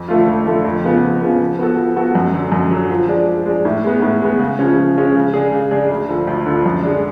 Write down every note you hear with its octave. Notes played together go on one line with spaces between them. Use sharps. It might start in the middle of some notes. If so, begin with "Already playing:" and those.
Already playing: F2
D3 F3 A3 F4
F2
D3 F3 A3 F4
F2
C#3 F3 B3
F2
C#3 F3 B3
F3
B3 F#4 A4
F3
B3 F#4 A4
F#2
D3 F#3
F#2
D3 F#3
F3
G#3 D4
F3
G#3 D4
A2
G#3 B3
A2
G#3 B3
C#3
F3 G#3 C#4
C#3
F3 G#3 C#4
C#3
G#3 D4 G#4
C#3
G#3 D4 G#4
D2
D3 F3
D2
D3 F3
F#2
D3 G#3 D4